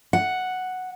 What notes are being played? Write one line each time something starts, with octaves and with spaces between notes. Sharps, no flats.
F#5